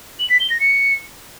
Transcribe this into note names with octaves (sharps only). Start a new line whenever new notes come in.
F#7
B6
G7
A#6
C#7